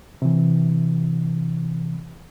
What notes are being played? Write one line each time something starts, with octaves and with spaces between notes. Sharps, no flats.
C3 E3